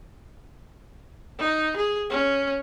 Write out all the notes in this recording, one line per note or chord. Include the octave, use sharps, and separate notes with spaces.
D#4
G#4
C#4